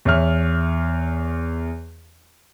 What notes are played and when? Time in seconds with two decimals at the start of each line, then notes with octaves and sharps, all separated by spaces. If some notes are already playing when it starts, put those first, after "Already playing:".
0.05 E2 C#5 E5 F6